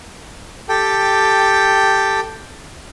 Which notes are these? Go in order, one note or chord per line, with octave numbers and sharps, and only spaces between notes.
G4 A4 G5